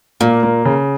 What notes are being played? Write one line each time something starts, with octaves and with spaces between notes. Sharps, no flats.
A#2 A#3
A#3
C#3